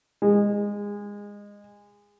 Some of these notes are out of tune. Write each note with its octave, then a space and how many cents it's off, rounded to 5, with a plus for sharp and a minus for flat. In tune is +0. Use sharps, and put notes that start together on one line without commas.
G#3 -20